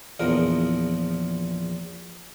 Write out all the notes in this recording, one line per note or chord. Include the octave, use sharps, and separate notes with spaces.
A#1 E2 F3 A#4